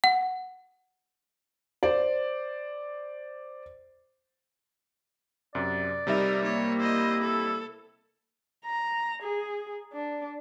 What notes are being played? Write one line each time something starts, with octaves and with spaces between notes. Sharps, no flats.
F#5
C5 D5
F#2 C3 D5
C3 G3 D#4 A#4 E5
A#3 C#5
E4 C5 D#5
A4
A#5
G#4
D4